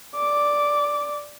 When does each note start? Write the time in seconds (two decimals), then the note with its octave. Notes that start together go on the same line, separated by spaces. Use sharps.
0.15 D5 D6